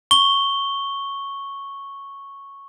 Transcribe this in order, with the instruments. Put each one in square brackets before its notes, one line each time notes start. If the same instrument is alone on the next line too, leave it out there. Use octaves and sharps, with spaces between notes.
[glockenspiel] C#6 G7